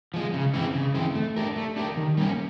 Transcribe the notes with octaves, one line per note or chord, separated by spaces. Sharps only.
F3 G#3
C#3
E3 G#3 C4
C#3
E3 G#3 C4
A3
D4 G4 A#4
A3
D4 G4 A#4
D#3
G3 A#3 C#4